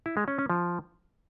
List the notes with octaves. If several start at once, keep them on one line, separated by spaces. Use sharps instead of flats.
E4
G#3
C#4
C#4
F3